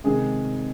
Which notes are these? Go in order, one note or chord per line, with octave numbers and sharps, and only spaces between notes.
C3 D#3 G#3 C4 G#4